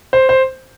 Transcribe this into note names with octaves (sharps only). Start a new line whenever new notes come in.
C5
C5